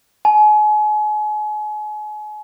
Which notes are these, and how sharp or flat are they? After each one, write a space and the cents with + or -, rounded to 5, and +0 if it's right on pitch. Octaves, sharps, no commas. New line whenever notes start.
G#5 +35